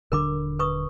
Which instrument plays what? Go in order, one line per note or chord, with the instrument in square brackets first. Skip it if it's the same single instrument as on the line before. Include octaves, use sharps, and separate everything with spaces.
[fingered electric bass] D#1 D3 D4 [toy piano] A#4 B5 D6
[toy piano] B4 C#6 D#6